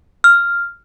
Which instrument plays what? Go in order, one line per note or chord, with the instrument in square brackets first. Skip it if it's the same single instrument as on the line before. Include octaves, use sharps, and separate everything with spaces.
[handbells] F6